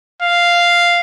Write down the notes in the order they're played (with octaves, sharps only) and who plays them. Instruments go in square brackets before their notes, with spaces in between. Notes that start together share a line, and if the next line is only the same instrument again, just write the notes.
[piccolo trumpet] F5